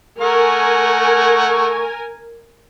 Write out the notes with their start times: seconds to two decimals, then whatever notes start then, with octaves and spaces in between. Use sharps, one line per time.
0.21 A3 A#4 F#5 G#5 C#6